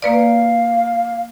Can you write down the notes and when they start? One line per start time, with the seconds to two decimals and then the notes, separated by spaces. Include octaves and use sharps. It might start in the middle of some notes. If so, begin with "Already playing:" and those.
0.02 A#3 B4 D5 F5